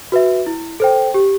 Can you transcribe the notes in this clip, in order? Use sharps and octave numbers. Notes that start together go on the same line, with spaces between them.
F#4 B4 E5
E4
A4 C5 G5
G4